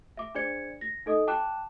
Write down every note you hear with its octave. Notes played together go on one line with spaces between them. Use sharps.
E5 D6
D4 G#4 C5 D5 G#6 C#7
A#6
D#4 A4 D#5 D#6
G5 A5 D6 F#6 E7